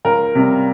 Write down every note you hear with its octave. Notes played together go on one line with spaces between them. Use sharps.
C#2 A#4
C3 G3